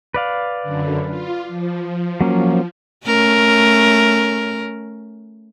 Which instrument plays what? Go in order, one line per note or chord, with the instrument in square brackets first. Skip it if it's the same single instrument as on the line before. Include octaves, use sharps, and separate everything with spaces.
[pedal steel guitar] B4 D5 F5
[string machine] F#2 D3
F4
F3
[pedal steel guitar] F#3 A#3 C#4
[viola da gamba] A3 C#4 A#4